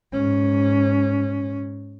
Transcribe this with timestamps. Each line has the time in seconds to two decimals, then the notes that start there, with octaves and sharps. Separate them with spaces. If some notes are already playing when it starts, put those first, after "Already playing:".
0.13 G#2 C#4